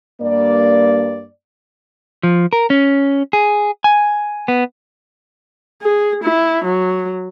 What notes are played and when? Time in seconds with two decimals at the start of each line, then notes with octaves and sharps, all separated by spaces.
0.21 G2 A#3 D5
2.23 F3
2.53 A#4
2.70 C#4
3.33 G#4
3.84 G#5
4.48 B3
5.81 G#4
6.22 E4
6.63 F#3